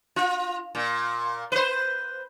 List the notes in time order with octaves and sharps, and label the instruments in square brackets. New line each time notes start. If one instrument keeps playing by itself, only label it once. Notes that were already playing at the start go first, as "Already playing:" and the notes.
[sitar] F4
A#2
B4 C5